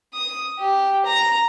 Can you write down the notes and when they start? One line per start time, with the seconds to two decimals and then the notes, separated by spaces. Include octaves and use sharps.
0.14 D#6
0.59 G4
1.06 A#5